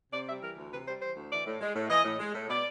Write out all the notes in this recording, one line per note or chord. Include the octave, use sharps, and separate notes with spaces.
C3 D5
G3 E5
E3 A#4
D2
C3 B4
G3 C5
E3 C5
D2
E3 D5
A2
G#3
A2
E3 D#5
A2
G#3
A2
B2 D5